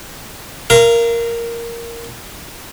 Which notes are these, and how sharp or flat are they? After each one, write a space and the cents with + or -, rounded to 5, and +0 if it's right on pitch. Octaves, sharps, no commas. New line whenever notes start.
A#4 +0 F5 -35